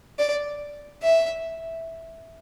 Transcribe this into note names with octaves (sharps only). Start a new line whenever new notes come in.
D5
E5